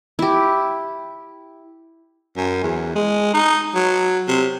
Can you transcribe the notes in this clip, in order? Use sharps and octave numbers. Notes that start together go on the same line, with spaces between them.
E4 G4
F#2
E2
G#3
D#4
F#3
C3